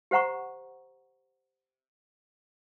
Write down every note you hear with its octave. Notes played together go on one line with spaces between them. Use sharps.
G4 C5 F#5 A#5 C#6